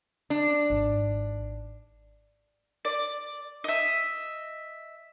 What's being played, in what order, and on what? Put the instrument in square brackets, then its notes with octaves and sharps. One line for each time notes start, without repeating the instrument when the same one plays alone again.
[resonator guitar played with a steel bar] D4
[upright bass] G#1
[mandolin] D5
D#5 E5